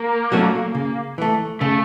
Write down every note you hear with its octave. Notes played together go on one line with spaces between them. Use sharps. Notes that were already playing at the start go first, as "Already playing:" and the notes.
Already playing: A#3
F#3 A3 C#4 F#4
C#3
E3 A3
C#3 A3